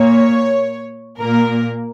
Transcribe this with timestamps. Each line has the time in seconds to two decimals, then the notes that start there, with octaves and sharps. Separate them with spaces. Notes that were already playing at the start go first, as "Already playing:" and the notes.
Already playing: A#2 A#3 C#5
1.19 A#2 A#3 A#4